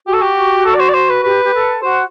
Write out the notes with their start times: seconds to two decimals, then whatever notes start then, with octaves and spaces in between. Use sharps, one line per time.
0.07 F#4 G4
0.13 A4
0.22 G4
0.65 A4
0.74 D5
0.80 C5
0.89 D5
0.94 C5
1.09 B4
1.23 G4 B4
1.43 G4
1.53 A4
1.82 F#4 C5